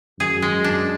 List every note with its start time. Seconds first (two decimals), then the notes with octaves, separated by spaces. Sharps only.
0.19 F#2 G#4
0.42 G#3
0.64 D4